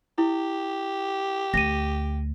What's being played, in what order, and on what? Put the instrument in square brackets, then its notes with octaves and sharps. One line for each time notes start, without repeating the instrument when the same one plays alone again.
[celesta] E4 [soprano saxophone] G4
[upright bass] D2 [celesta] A#6 D#7